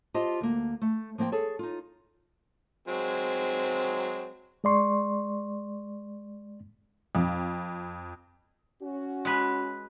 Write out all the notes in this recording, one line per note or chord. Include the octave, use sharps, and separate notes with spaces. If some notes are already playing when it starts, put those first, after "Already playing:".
F4 G4 C5 D#5 A5
D2 A#3
A3
F3 A#3 C4 D#5 G5
G#4 A4 C#5
D#4 F4
F#3 G#3 C4
G#3 D5 C6 C#6
F2
C#4 F#4
G#3 B4